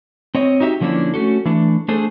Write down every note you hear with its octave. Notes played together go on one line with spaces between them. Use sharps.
C4 C#5 D#5
D#4 F#4 G4 E5
D3 F3 A#3 C#4 D4 E4
A3 C#4 F#4 A4
E3 A3 D4
A3 D4 G#4 A4 C5